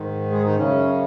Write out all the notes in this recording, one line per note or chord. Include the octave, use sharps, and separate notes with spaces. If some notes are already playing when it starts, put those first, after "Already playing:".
Already playing: G#2 D#3
G#3 G#4
D#3 D#4
F#2 C#3 C#4